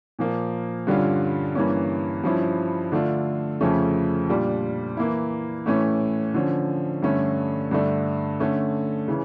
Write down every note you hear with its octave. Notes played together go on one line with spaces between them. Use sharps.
A#2 F3 A#3
G2 D3 G3 C#4 F4
G2 E3 A#3 C#4
G2 F3 C#4 E4
D3 A3 D4 F4
F2 C#3 F3 A3 C#4
A#2 G3 D4 F4
E3 A#3 E4
A2 E3 A3 C#4
D3 F3 C#4
G2 D3 A3 C#4
G2 D3 A3 D4
D3 A3 C#4
C#3 E3